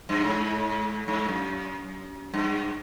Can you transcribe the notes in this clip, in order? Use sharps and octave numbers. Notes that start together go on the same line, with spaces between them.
G2
G#2
G#2
F#2
G2